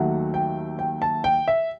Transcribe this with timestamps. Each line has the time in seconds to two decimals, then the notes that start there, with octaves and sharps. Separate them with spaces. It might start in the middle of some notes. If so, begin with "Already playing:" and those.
Already playing: D#2 D#3 F#3 A3 F#5
0.34 G5
0.79 G5
1.02 A5
1.24 G5
1.48 E5